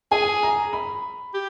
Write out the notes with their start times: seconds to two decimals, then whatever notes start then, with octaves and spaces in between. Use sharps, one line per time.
0.11 G#4 G#5
0.43 A#5
0.73 B5
1.34 G4